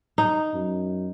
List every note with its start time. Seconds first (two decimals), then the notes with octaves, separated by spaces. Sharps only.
0.18 D#4
0.54 F#2